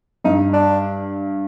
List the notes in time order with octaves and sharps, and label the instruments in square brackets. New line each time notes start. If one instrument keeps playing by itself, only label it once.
[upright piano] G2 [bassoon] D#4
[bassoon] D4